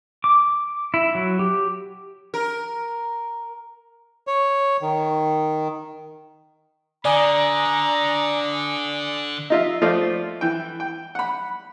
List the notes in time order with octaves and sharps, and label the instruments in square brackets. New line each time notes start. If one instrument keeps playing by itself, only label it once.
[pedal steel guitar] D6
E4
F#3
G4
[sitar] A#4
[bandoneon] C#5
D#3
[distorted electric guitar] D3 [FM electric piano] D5 G#5 D#6 [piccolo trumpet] A#5
[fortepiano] D#4 F4 E5
F3 A3 F4 C5 D5 D#5
E3 G5
G5
F#5 B5